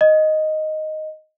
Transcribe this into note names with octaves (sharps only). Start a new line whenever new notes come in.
D#5